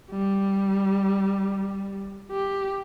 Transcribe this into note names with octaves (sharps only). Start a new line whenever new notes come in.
G3
G4